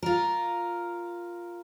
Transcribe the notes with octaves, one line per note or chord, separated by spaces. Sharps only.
F4 A#4